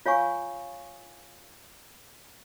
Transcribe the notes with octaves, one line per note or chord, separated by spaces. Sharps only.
F4 C#5 F5 G#5 C#6